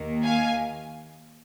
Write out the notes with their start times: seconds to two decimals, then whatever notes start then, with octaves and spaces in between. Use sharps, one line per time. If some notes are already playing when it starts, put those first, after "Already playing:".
Already playing: D#2 D#3 A#3
0.24 F5 G#5